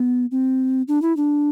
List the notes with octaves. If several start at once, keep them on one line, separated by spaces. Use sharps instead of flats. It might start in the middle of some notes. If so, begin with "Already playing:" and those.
Already playing: B3
C4
D4
E4
D4